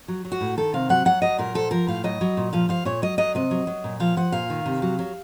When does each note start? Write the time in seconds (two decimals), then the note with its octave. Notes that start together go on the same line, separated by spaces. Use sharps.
0.08 F#3
0.25 F#3
0.32 F#4
0.41 A2
0.57 D#3 A4
0.74 C3 F5
0.89 F#3 F#5
1.05 F#3 F#5
1.22 F#3 D#5
1.38 A#2 A#4
1.55 F3 A4
1.71 F3 A#4
1.87 A2 F5
2.04 F#3 D#5
2.21 F#3
2.37 A#2
2.53 F3 F5
2.69 F3 F5
2.85 A#2 C#5
3.02 F#3 D#5
3.18 F#3 D#5
3.35 C3 D#5
3.51 F#3
3.67 F#3
3.84 A#2
4.00 F3 F5
4.17 F3 F#5
4.32 A#2 F5
4.50 D#3
4.66 C3
4.82 F#3
4.99 F#3